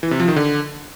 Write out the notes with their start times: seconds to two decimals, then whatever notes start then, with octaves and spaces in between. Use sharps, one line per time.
0.03 E3
0.11 C3
0.20 F3
0.28 D#3
0.36 D3